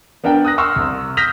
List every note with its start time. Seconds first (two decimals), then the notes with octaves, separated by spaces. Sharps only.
0.24 B3 D4 A#4 F#5 G5
0.45 D#6 F#6 A#6
0.58 C6 C#6 E6 F6
0.76 C2
1.17 D#6 F6 G6 A#6 B6 F7